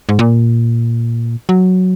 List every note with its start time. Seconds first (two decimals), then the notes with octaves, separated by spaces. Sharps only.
0.09 G#2
0.19 A#2
1.49 F#3